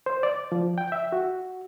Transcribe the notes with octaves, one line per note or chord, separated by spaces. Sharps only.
C5
D5
F3
G5
E5
F#4